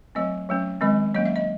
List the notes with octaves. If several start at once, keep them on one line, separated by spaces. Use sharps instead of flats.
F#3 A3 C4 D#5
F#3 A3 C#4
D#3 G#3 C4 D#5
F#3 A#3 C#4 D#5
E5
D#5